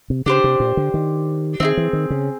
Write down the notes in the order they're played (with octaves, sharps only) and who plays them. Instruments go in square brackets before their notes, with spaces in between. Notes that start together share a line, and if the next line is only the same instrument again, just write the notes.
[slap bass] C3
[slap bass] C#3 [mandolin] D4 G4 C5
[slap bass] C3
A#2
D3
D#3
[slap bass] D#3 [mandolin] C4 D#4 G#4
[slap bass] E3
D#3
C#3